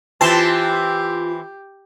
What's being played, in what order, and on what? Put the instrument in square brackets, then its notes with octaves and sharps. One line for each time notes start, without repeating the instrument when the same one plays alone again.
[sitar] E3 C4 [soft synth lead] F4 [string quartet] G4 [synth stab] A5 C6